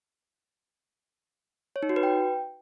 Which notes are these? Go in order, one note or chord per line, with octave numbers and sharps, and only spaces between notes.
C#5
D#4
F#4
B4
G5